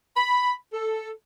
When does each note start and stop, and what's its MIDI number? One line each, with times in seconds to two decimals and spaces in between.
0.16 0.53 83
0.73 1.10 69